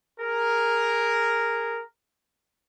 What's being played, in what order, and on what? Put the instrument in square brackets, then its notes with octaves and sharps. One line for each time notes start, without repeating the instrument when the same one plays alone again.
[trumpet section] G#4 A#4